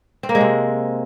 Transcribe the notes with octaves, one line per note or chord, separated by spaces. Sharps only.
C4
A#3
G#3
C3